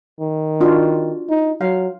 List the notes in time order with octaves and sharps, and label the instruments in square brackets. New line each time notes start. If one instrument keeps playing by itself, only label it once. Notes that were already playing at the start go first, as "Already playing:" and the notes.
[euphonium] D#3
[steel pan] D4 F4 F#4
[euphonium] D#4
[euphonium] F#3 [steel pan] F5